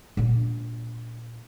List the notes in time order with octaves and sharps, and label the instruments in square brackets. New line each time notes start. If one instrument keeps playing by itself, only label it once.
[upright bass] A#2 D4